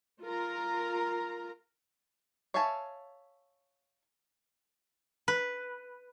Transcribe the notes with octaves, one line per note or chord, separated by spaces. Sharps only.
F4 A#4 A#5
C#5 E5 F5 G#5 A5
B4